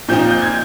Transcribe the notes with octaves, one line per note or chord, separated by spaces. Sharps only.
A#2 F3 C4 D#4 G6
G6
G#6